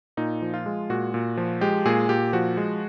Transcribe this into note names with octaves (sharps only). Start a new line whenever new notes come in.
A#2 D#4
F3
F4
G#3
A#2 F#4
A#2
F3
G#3 G4
A#2 G#4
A#2 G4
F3 F#4
G#3